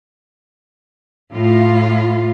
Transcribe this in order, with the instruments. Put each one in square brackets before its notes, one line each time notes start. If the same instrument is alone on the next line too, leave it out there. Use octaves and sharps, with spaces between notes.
[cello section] A2 F4